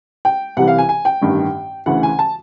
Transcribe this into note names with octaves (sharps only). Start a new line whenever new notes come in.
G5
C2 C3 E3 F#5
F5
G#5
G#5
G5
A1 G2 D#3
D2 C#3 E3 F#5
G#5
A5